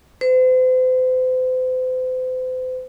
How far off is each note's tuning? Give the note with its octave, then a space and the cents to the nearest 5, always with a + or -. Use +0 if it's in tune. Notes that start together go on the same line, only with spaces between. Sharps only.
C5 -40